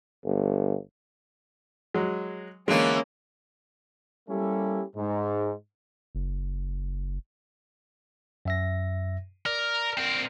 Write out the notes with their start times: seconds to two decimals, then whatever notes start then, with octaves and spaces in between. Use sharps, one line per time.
0.25 G1
1.94 F#3 G#3
2.68 D3 E3 G#3 A#3 B3 C#4
4.28 G3 A#3 C#4 E4 G4 A4
4.96 G#2
6.15 F#1
8.45 F#2 E5 A#6
9.46 A#4 D5 F6
9.97 C4 A#4